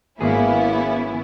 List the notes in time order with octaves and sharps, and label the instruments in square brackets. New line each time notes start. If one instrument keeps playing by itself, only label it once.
[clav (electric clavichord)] G#1 G#4 [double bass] A#3 [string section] B3 C#4 E4